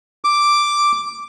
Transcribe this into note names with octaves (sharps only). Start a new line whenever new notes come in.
D6